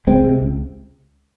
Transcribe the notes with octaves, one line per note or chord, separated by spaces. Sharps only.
C#2 G#3 C4
C3
C#2